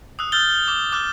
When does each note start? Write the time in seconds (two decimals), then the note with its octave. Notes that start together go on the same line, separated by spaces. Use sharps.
0.19 D#6 E6 F#6
0.32 E6 F6 G6 A6 G7
0.68 D6
0.92 D6 F6 F#6